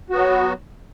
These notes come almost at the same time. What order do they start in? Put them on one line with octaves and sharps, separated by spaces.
F#4 B3 F#3